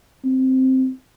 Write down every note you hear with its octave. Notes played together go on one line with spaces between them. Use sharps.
C4